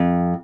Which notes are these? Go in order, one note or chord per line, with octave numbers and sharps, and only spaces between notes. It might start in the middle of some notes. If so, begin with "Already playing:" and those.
Already playing: F2